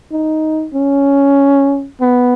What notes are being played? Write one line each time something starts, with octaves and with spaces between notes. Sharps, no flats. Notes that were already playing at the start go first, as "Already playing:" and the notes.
D#4
C#4
B3